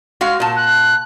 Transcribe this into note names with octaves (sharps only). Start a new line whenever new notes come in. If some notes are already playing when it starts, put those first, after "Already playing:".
G#3 F#4 F5
A#2 A5
F#6